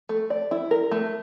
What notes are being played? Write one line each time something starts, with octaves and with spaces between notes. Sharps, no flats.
A3
D5
E4
A#4
A3